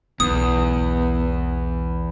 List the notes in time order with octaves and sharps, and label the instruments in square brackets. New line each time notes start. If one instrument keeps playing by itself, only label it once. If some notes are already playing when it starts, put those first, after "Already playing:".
[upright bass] B1 [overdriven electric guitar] E2 [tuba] B3 [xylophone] D#6